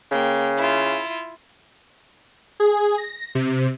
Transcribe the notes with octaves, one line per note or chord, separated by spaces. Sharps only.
C#3 A#3 G5
E4 F4
G#4
A#6
C3